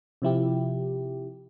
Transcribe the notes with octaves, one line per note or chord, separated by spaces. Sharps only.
C3 F3 E4 G4